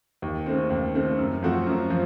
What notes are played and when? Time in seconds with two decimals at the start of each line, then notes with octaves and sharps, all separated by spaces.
0.22 D#2
0.46 C#3 A3 C4
0.70 D#2
0.95 C#3 A3 C4
1.19 F#2
1.43 F3 A3 C4 F#4
1.67 F#2
1.90 F3